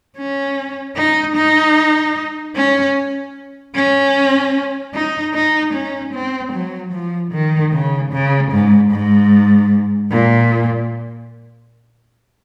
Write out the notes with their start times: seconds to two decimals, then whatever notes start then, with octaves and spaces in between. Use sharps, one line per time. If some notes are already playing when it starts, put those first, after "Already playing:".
0.18 C#4
0.96 D#4
1.36 D#4
2.55 C#4
3.75 C#4
4.94 D#4
5.34 D#4
5.73 C#4
6.13 C4
6.53 F#3
6.92 F3
7.32 D#3
7.72 C#3
8.12 C#3
8.52 G#2
8.91 G#2
10.11 A#2